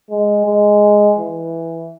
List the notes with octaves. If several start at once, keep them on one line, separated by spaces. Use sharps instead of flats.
G#3
G#3
E3